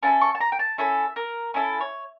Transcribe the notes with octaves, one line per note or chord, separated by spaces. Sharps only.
C#4 E4 A4 A5
C#6
A5
A#5
G5
A5
C#4 E4 A4 E5
A#4
C#4 E4 A4
C#5